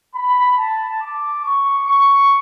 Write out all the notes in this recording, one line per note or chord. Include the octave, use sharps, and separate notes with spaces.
B5
A5
D6
C#6
C#6